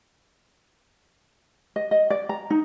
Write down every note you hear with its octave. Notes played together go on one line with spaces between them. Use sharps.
D#5
D#5
D5
A#5
D#4